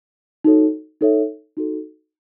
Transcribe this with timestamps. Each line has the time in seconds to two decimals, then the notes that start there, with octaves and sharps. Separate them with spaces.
0.44 D#4 F#4 A4 C#5
1.01 D#4 A4 C#5 E5
1.57 D#4 F#4 A4